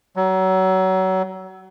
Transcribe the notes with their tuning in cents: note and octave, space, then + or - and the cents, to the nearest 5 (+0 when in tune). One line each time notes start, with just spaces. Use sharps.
F#3 +30